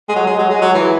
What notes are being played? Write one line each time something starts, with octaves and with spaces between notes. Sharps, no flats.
G#3
F#3
G#3
F#3
G#3
F#3
E3